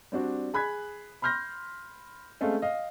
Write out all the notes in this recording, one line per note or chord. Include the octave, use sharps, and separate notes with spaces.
G3 C4 D4 F#4
G#4 B5 F#6 G#6 B6
B5 C6 F6 G6 A#6
G#3 A3 C4 C#4 A4 F5
D#5 F5